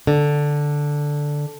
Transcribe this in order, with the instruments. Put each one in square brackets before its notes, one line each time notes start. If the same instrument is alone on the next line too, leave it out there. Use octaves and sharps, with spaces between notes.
[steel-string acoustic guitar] D3